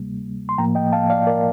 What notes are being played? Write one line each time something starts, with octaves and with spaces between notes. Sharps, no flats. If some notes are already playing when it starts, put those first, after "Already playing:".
Already playing: D2 C3 G3 A#3
C6
A2 F3 A#3 G5 A#5
D#5 G5
F5 A5
D5 F5
A#4 D5